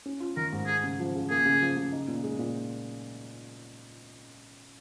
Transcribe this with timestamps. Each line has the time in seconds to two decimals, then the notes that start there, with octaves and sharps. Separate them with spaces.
0.06 C#4
0.20 F4
0.37 D#3 A#4
0.52 G#2
0.67 G#3 G#4
0.84 C#3
1.00 F3
1.15 C#3
1.30 A#3 G#4
1.46 C#3
1.62 F3
1.77 C#3
1.93 D#4
2.08 A#2
2.23 G#3
2.39 A#2